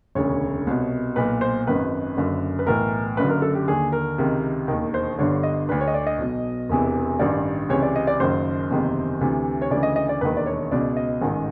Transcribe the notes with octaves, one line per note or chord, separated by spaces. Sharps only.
E1 D2 C#3 C#5
C2 B2
B1 A#2 B4
C5
G#1 F#2 D#3 B4
F#1 F#2 D3
B4
B1 A2 E3 A#4
F#1 F#2 D3 B4
A#4
A4
G4
D#2 D3 G#4
A#4
C#2 C3 D#3
E1 D#2 D#3
C5
G1 G2 D3 C#5
D#5
D2 D3 B4
C#5
D#5
D5
D#5
B1 B2
E1 E2 C3 E3
A1 G2 D#3 D5
C#2 C3 E3 C#5
D5
D#5
D5
F#1 F#2 D#3 C5
F#1 E2 C3 D#3
D2 C3 E3
C#5
D2 C#3 E3 D5
D#5
D#5
D5
E1 D#2 D#3 B4
D5
C#5
C#2 B2 D5
D#5
A1 G#2 D#3